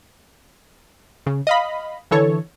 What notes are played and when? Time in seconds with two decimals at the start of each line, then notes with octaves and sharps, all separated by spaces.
1.26 C#3
1.47 D#5 F5 B5
2.11 D3 E3 A4 C#5